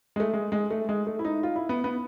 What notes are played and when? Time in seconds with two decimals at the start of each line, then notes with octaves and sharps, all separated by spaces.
0.16 G#3
0.20 A3
0.33 G#3
0.52 G#3
0.70 A3
0.89 G#3
1.07 A3
1.19 E4
1.25 D#4
1.43 F4
1.56 E4
1.69 B3
1.84 B3